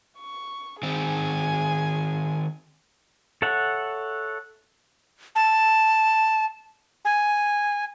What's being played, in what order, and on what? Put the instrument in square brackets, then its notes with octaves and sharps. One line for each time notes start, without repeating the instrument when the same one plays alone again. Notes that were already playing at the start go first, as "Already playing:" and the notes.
[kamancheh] C#6
[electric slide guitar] D#3 C4 D#4 [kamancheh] G#4 G#5
[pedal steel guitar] A4 C#5 E5 F#5
[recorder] A5
G#5